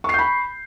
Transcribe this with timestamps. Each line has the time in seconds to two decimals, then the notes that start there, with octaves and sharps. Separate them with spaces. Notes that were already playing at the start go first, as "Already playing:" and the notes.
0.04 C#6
0.09 C7
0.14 G6
0.19 B5